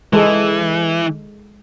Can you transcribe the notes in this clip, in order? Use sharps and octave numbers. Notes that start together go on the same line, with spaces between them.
E3 G#3 A4